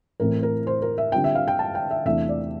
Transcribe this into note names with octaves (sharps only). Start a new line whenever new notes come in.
A2 E3 A3 C4 E4 A#4
A#4
C5
A#4
E5
D3 G3 C4 F4 G5
E5
F5
G5
A5
G5
E5
E2 C3 E3 A3 D4 E5
D5